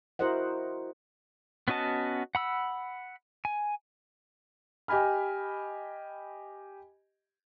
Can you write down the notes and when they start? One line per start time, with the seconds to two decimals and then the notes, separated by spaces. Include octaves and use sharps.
0.19 E4 F#4 A#4 C5 D#5 F#5
1.68 B3 C#4 F#4 D#5 A5
2.35 F#5 B5 E6
3.45 G#5
4.88 G4 D#5 G#5 B5 F6